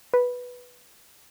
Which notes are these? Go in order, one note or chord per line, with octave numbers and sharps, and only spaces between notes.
B4